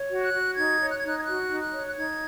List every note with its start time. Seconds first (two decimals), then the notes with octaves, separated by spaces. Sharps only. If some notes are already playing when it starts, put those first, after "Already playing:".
Already playing: C#5
0.10 F#4
0.20 F#6
0.32 F#4
0.55 D#4 G#6
0.80 C#5
0.91 F#6
0.99 G#6
1.03 D#4 F#6
1.20 G#6
1.26 F#4 F#6
1.50 D#4
1.61 F#6
1.72 C#5
1.87 F#6
1.96 D#4 G#6